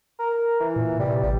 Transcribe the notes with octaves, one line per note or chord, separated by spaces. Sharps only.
A#4
E3
A#2
C3 G3
A1 G3